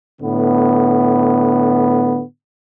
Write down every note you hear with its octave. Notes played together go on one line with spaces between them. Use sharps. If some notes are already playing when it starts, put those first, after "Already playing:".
A2 D3 B3